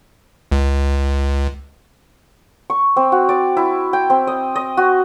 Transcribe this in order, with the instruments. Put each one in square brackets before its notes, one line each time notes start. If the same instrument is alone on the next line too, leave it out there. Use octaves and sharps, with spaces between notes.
[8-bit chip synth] C#2
[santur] C#6
C4
F#4
D5
E4
G5
C4
D#5
D#5
F#4